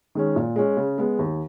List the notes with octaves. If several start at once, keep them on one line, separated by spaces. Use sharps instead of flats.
D#3 G#3 C#4
A#2
G#3 C#4
C#3
G#3 B3
D#2